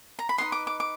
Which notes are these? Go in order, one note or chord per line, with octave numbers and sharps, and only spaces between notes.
A#5
B5
D#4 G4 B4 D#5 C6
D6
D6
D6